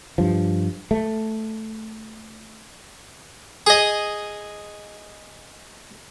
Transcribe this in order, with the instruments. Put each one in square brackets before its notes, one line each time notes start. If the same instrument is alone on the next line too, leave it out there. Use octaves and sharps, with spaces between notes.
[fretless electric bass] G2 F3
A3
[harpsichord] G#4 D#5